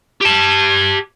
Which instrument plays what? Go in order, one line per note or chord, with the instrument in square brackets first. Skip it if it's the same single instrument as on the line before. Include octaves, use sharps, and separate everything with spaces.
[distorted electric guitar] G4 A5